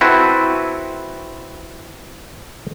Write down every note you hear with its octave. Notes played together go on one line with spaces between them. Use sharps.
C4 E4 F#4 A4 B4